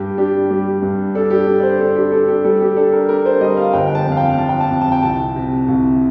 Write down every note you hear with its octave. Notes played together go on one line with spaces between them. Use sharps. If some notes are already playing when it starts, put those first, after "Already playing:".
Already playing: G2 G3 G4
D4 G4
G3 G4
G2
D4 A4
G4
D4
D5
C5
D4 A4
G4
D4 A4
G4
G3 A4
G4
D4 A4
A#4
D4 A#4
C5
G3 D#5
F5
G1 G5
G5
A5
F2
F5
G5
F2 A5
G5
A5
F2
A5
G5
C2 A5
C3
C2